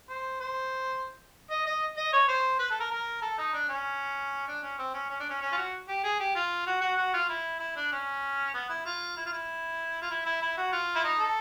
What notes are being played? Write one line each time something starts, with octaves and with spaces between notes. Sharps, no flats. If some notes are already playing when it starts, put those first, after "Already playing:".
C5
C5
D#5
D#5
D#5
C#5
C5
B4
A4
A#4
A#4
A4
D#4
D4
C#4
D4
C#4
C4
C#4
C#4
D4
C#4
C#4
F4
F#4
G4
G#4
G4
F4
F#4
F#4
F#4
F4
E4
E4
D4
C#4
B3
E4
F4
E4
F4
E4
F4
E4
E4
E4
F#4
F4
E4
D#4
A4